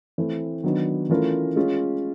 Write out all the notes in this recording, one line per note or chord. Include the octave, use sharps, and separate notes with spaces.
E3 A3 C4
D#3 F#3 B3 D4
E3 A3 C#4 F4 A#4
G#3 C#4 F4